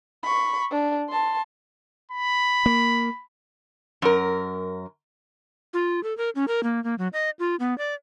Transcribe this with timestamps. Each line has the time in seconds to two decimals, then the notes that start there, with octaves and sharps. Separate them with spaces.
0.23 B5 C#6
0.71 D4
1.09 A5 C6
2.11 B5
2.66 A#3
4.02 F#2 A#4
5.74 F4
6.03 A4
6.17 A#4
6.35 C#4
6.48 A#4
6.63 A#3
6.84 A#3
6.98 F#3
7.13 D#5
7.39 F4
7.60 B3
7.78 D5